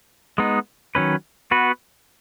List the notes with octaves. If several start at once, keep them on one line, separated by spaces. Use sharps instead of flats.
G#3 B3 D#4
D#3 F#3 C#4 B4
B3 F#4 B4